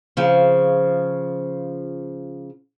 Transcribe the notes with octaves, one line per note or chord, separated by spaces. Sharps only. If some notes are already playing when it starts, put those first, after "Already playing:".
C#3 F3